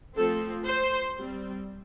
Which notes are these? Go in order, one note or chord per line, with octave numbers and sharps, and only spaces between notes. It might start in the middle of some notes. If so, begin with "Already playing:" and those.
F3 A3 C4 A4
C5
G3 C4